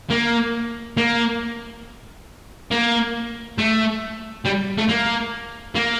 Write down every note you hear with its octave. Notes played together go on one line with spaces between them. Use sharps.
A#3
A#3
A#3
A3
G3
A3
A#3
A#3